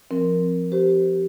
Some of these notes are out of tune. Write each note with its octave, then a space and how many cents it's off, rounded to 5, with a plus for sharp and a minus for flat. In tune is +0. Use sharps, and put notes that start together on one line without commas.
F3 -5 C4 +10 A#4 +0
G4 -20 C5 -25